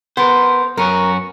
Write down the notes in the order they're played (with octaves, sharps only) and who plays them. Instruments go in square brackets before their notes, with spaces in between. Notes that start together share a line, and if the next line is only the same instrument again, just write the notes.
[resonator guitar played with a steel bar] B3 [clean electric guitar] A#4 C5
[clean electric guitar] F#2 C#4 F#4 [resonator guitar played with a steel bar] A#4